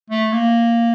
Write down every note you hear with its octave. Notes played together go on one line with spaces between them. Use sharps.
A3
A#3